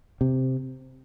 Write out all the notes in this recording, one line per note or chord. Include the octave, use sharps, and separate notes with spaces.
C3